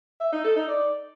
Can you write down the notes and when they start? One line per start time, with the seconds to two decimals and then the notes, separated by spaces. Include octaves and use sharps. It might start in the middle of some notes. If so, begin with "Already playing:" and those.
0.21 E5
0.32 D#4
0.44 A4
0.56 D#4
0.68 D5